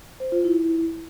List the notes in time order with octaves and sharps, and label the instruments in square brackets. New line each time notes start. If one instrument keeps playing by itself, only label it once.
[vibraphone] C5
F4
E4